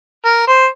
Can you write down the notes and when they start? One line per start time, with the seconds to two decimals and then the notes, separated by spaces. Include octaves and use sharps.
0.25 A#4
0.47 C5